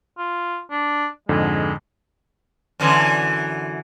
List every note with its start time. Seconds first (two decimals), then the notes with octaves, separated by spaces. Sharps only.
0.18 F4
0.71 D4
1.29 F2 G#2 D3 G#3
2.80 F#2 D3 E3